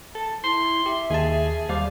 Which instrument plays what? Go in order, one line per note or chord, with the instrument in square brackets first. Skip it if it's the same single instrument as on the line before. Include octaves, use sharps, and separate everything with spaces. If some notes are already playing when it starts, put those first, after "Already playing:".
[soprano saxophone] A4 [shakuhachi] A5
[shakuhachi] E4 [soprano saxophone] C6
[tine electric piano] G4 [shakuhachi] E5
[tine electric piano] D#2 A5 [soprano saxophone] G#4
[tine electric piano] D#2 G3 D5 [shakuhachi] C5 [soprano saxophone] F5